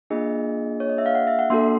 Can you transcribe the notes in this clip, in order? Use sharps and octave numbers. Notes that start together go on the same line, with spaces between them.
A#3 D4 F4 G#4 D#5
C#5
D#5
E5
F5
F#5
E5
F#5
A#3 D4 F#4 A4 C6